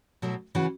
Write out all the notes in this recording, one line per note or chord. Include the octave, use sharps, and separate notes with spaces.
B2 F#3 A3 E4
C#3 E3 C#4 F#4